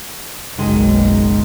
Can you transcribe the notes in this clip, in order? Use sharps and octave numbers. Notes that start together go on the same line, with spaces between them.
F#1 B1 D#3 G#3